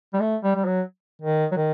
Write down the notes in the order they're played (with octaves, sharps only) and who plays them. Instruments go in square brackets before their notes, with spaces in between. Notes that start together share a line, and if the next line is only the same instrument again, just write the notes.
[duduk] G3
A3
G3
G3
F#3
D#3
F#3
D#3